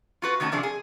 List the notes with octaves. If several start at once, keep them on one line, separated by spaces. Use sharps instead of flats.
F4 F#4 B4
D#3 A3 C#4 F#4 A5
C3 F3 D4 G#4
G#4